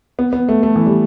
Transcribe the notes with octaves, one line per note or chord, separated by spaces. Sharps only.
B3
B3
A3
A3
E3
G3